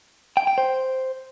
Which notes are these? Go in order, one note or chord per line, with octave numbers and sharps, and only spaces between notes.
G5
G5
C5